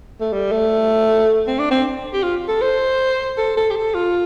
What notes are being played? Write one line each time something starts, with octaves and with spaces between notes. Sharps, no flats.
A3
G3
A3
C4
D4
C4
G4
F4
A4
C5
A4
A4
G4
A4
F4